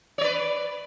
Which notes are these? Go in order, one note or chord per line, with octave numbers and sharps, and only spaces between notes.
B4 C#5 D5